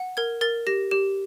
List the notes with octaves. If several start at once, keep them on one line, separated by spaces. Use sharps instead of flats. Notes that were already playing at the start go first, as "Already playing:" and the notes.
Already playing: F#5
A#4 G#6
A#4 A6
G4 A#6
G4